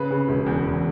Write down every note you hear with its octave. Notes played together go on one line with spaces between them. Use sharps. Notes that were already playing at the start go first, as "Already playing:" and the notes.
Already playing: C#3 B4
C#3
E1
E2
E2